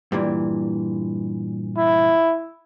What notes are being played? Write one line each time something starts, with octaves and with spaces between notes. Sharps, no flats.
G2 A#2 E3
E4